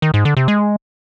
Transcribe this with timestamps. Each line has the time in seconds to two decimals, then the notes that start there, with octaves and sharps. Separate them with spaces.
0.02 D#3
0.14 G#2
0.25 D3
0.37 C3
0.48 G#3